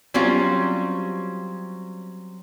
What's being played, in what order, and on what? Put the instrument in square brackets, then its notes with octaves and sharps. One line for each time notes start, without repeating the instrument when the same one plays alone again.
[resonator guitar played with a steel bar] F#3 G3 C4 C#4 F4